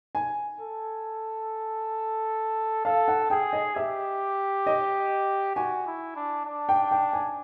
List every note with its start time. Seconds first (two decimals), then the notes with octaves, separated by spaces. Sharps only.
0.15 G#5
0.60 A4
2.85 A4 F5
3.08 F#5
3.30 G#4 G5
3.53 D#5
3.76 G4 E5
4.67 D#5
5.56 F#4 G#5
5.87 E4
6.16 D4
6.46 D4
6.69 G5
6.91 G5
7.13 G#5